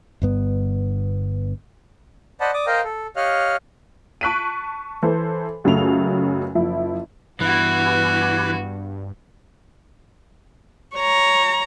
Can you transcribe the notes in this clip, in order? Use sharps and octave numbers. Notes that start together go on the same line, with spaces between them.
G1 G2 B3
C5 D5 D#5 F#5 A5 B5
D5 D6 D#6
A#4 C5 D#5 F5 G5 A#5
A4
G4 C#5 D#5 F5 F6 F#6
A5 C#6 F#6 B6 D7 D#7
E3 A4 C5
C#2 F#2 C#3 A3 F7
F#1 F3 E4
G2 E3 B3 F#4 B4
C#5 A#5